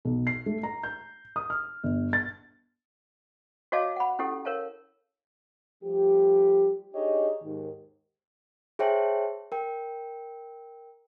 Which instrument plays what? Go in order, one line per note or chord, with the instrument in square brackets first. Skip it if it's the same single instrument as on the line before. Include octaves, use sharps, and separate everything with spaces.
[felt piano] B1
C7
A3
A#5
G6
D#6
F6
G1
A6
[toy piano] F#4 C#5 D#5 F5 A5 D6
F#5 B5
C#4 E4 G4 A4
A#4 C#5 F5 A5
[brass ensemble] F3 G3 A3 G4
D4 D#4 G4 G#4 C#5 D#5
D#2 G#2 D#3
[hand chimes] G#4 C5 C#5 E5 G5 A5
A#4 G5